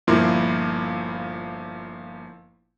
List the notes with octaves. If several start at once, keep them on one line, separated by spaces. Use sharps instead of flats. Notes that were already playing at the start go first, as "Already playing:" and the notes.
G1 A#2 F3 E4 A#4 C6